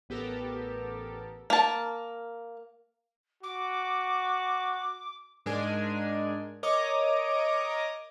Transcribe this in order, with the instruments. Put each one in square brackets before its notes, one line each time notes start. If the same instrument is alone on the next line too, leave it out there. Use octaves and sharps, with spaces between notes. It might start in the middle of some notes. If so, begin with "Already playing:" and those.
[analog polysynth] A1 B3 G4 A4 A#4
[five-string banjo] A#3 A5
[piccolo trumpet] F#4 [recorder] D6
[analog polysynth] G#2 G#3 D4 A#4 G#5
A#4 C#5 D#5 A#5 D6 D#6